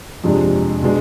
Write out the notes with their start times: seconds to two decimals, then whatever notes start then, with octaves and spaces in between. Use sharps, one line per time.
0.24 F2 C3 G#3 D4
0.82 B2 G#3 D4